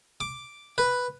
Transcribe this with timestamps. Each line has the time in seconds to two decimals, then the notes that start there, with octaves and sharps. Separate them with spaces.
0.21 D6
0.78 B4